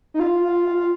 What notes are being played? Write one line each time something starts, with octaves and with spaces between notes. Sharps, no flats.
D#4
F4
F4
F4
F4